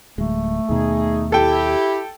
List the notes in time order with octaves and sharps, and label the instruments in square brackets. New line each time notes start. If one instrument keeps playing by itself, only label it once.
[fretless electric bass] D1 G#3 [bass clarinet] A3
[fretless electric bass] D#2 B2 [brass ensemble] D#4 G#4
[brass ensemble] E4 G4 [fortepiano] A4 G5